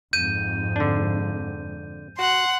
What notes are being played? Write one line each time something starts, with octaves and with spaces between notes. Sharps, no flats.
F2 G#2 G6 D#7
D3 D4
F#4 F#5 C6